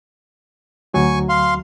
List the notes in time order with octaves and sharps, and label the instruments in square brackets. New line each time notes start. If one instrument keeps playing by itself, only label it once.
[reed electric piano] D2 F#3 [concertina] G#5 C#6
[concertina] F5 C6